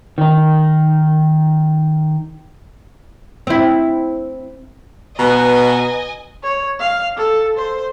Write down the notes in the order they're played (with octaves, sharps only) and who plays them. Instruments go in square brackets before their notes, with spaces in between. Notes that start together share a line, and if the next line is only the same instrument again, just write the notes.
[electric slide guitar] D#3 D#4
[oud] C4 E4
[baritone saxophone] B2 [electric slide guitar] B4 A#5 [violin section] D#5 G#5
[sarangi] C#5
F5
A4
C5